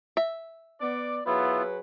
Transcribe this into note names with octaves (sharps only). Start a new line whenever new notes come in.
E5
B3 D5 D6
F#3 B3 E4 F4 G#4 B4